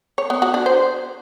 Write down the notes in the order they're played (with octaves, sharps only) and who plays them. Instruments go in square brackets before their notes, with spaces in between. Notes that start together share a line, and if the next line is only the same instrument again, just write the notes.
[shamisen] C#5
B3
F#4
D4
C5